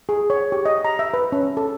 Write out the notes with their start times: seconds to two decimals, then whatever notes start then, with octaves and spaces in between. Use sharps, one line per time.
0.09 G#4
0.30 C#5
0.52 G4
0.66 D#5
0.85 A#5
0.99 E5
1.14 B4
1.32 C#4
1.57 A4